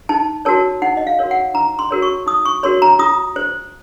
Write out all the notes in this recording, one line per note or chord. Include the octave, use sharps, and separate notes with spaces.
D#4 A5
F#4 A#4 C#5 A5
D#4 F#5
D#5
F5
F#4 A#4 C#5
F#5
D#4 A#5
C6
F#4 A#4 C#5
C#6
D#4 D#6
C#6
F#4 A#4 C#5 C6
A#5
F4 D#6
C5